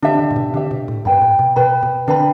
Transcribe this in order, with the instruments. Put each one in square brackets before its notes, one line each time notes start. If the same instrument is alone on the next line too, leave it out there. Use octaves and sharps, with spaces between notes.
[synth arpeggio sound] D3 [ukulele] D4 G4 E5
[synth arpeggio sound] D3
A2
B2
[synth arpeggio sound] D3 [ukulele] D4 G4 E5
[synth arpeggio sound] B2
A2
[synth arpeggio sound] G2 [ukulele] B4 G5 B5
[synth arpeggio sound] A2
B2
[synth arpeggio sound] B2 [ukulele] B4 G5 B5
[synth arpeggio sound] B2
[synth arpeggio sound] D3 [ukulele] D4 B4 G5 B5